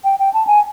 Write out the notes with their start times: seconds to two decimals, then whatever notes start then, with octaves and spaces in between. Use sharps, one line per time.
0.04 G5
0.19 G5
0.34 A5
0.47 G#5